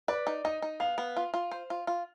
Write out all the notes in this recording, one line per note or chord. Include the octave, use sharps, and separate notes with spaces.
B4 D5
D#4
D#4 D#5
D#4
B3 F5
B3
F4
F4
C5
F4
F4